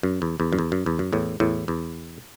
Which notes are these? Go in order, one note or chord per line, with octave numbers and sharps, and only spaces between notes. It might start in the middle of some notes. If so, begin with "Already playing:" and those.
F#2
E2
E2
F#2
E2
F#2
E2
F#2
E2 A2
E2 A2
E2